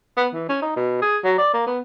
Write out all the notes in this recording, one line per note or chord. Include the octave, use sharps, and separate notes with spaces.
B3
E3
C#4
D#4
B2
G#4
F#3
D5
A#3
B3